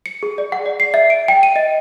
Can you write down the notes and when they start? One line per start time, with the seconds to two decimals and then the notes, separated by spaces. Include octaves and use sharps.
0.06 C#7
0.23 G#4
0.38 D5
0.52 F#5
0.66 D5
0.80 C7
0.94 E5
1.10 D7
1.28 G5
1.43 D#7
1.56 D#5